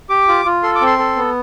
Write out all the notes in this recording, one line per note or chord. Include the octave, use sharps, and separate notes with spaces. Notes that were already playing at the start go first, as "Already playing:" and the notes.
G4 D6
F4
F4
A4 C6
D6
C4
C6
A4
B3